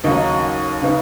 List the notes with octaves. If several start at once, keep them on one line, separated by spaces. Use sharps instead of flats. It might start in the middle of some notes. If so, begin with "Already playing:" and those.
D#2 C#3 F#3 D#5
C#3 B3 D#4